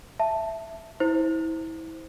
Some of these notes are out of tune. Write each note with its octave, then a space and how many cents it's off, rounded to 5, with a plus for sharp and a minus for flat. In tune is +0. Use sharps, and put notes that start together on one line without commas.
E5 +0 A5 +0
E4 -30 C5 +0